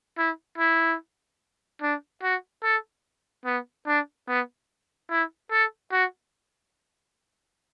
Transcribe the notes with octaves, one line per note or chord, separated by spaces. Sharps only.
E4
E4
D4
F#4
A4
B3
D4
B3
E4
A4
F#4